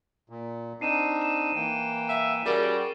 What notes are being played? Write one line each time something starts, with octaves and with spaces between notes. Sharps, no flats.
A#2
C4 D4 D#4 C7 D#7 E7
E7
E3 A#3 G5
E5 F5
G3 C#4 F#4 G#4 A#4 D5